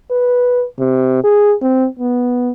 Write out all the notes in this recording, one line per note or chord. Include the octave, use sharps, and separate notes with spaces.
B4
C3
G#4
C4
B3